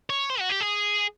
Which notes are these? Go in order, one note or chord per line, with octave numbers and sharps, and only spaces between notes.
C#5
C5
F#4
G4
G#4